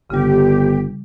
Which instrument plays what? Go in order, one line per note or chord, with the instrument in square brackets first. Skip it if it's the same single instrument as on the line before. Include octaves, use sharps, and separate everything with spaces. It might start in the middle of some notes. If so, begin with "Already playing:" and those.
[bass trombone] G1 [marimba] C#3 G3 [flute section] G4